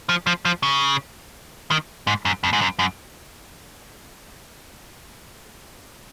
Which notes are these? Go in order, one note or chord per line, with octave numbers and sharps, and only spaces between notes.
F3
F3
F3
C#3
D#3
G#2
F#2
F2
G#2
F#2
F#2